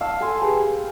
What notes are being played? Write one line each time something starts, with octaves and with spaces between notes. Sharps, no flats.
F5 A5 E6
A4 G#5 A5 C6
G4 G#4 B4